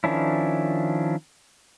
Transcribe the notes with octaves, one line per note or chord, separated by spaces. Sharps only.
D#3 F3 C#4 D4 E4